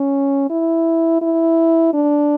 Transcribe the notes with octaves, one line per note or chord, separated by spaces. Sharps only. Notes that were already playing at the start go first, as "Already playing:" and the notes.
Already playing: C#4
E4
E4
D4